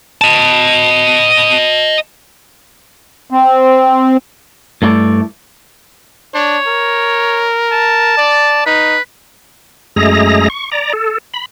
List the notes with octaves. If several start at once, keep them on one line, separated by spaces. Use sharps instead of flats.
D#5 A5
C4
G2 A3 E4 D5
D4 C#5
A#4
A5
D5
D#4 B4
F#2 G#3 A3 G#4 A#5 A#6
C#6
D5 A#5
A4
B5